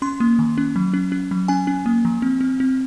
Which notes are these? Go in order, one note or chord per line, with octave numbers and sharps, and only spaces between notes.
C#4 C6
A#3
D#3
C#4
F#3
C#4
C#4
F#3
C#4 G#5
C#4
A#3
F3
C4
C4
C4